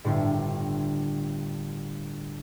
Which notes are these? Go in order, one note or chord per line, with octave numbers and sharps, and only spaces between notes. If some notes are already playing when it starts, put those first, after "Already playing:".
G1 A2